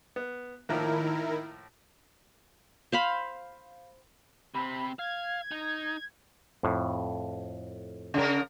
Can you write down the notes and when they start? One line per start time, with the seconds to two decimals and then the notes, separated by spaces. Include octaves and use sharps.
0.16 B3
0.69 A2 D#3 F3 A#3 E4 A#4
2.92 C5 F5 B5
4.55 C3 C4 B5
4.99 F5 G#6
5.51 D#4
6.63 F2 A2
8.14 C#3 A#4